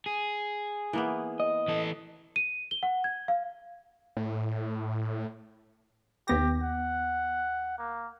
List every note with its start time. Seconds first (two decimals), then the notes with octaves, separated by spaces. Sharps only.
0.06 G#4
0.93 E3 A#3 B3
1.40 D#5
1.68 E3 A4
2.36 D#7
2.71 G7
2.83 F#5
3.04 G#6
3.28 F5
4.17 A2
6.28 D#2 B3 G4 A#6
6.62 F#5
7.78 A#3